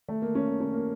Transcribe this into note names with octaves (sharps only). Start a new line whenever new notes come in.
A3
A#3
C#4
A#3
C#4
A#3